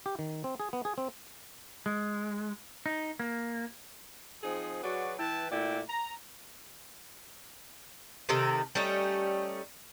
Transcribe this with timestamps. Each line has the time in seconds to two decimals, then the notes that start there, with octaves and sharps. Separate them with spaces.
0.06 G4
0.19 D#3
0.44 C4
0.60 G#4
0.73 B3
0.85 G#4
0.98 C4
1.86 G#3
2.86 D#4
3.20 A#3
4.43 F3 C4 D#4 G#4
4.84 F#3 F#4 G#4 B4 D5
5.19 E3 E4 B4 G5 A5
5.51 A#2 A3 E4 D5 G5
5.89 A#5
8.29 C3 D#3 A4
8.75 G3 A3 C#4 D#4